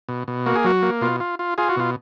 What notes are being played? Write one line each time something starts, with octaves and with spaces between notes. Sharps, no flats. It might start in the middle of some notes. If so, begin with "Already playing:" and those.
B2
B2
A#3 F#4
G#4
F#3 F#4
A#3
B2 F4
F4
F4
F4 G#4
F#4
B2 F4